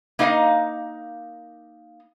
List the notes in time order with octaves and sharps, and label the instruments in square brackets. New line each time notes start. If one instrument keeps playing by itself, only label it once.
[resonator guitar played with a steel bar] A#3 D#4 D#5 F5